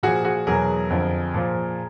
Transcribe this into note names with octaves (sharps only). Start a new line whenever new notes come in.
A#2 F3 F#4 G#4
F#4 G#4
E2 B2 F#3 G#4 A#4
F2 D3 F3
A#2 F3